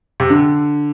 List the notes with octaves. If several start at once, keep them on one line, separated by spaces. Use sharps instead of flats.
C3
D3